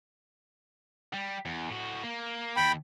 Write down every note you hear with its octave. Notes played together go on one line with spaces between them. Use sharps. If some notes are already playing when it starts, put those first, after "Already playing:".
G3
E2
A2 F#4
A#3
D#2 G5 B5